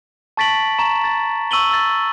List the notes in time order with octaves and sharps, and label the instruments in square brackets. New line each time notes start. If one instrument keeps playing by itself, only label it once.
[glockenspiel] A5 C#6 A6 B6 D7 F#7
A#5 C#6 E7
A6
C#6 E6 D#7 F#7 G7
E6 A6